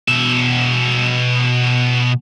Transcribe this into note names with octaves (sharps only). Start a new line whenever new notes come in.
B2 E5